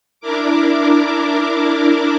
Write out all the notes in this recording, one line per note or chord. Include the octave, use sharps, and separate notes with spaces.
D4 E4 A#4 D6